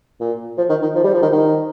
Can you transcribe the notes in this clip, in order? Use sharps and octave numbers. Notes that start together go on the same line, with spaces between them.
A#2
F3
D#3
D#3
F3
G3
F3
D#3
D#3